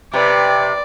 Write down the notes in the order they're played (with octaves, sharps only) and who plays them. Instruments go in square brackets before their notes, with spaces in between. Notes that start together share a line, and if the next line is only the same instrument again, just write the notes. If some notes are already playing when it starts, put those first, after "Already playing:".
[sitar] C3 [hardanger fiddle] B4 [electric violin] D5